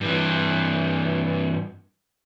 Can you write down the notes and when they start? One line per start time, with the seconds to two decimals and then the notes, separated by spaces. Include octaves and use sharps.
0.01 G2 E3